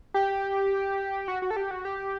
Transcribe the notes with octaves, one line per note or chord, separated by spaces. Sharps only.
G4
F#4
F#4
A4
G4
F#4
G4